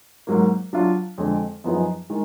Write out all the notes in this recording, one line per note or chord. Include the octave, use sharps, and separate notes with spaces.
G#2 F#3 A#3
F#3 D4 F4
F2 D3 G#3
F#2 F3 B3 D#4 G#4
D#3 G#3